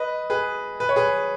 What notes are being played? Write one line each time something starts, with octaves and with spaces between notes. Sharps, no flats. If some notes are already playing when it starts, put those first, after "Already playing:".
Already playing: B4 D#5
G#4 B4
B4
C#5
G#4 B4